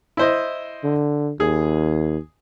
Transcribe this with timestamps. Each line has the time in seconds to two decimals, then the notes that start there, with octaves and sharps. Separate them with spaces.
0.17 E4 C5 D#5
0.84 D3
1.40 D#2 G#4